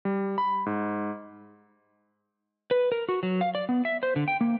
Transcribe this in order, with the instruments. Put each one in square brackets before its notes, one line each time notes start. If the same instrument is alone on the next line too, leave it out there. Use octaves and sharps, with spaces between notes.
[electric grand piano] G3
B5
G#2
[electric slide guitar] B4
A#4
F#4
F#3
F5
D5
B3
E5
C5
D3
G5
A#3